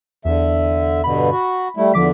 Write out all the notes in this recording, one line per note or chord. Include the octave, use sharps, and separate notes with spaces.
E2 D3 E5
G2 B2 D3 B5
F#4
G3 A3 E4
E2 D3 F3 D6 B6